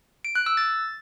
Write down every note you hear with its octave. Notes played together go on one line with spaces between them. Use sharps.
D7
F#6
E6
A6